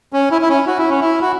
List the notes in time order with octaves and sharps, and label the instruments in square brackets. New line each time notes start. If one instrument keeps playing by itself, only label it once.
[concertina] C#4
E4
E4
C#4
F#4
E4
C#4
E4
F#4